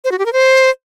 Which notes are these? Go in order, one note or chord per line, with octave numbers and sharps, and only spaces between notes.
C5
F#4
G4
A#4
C5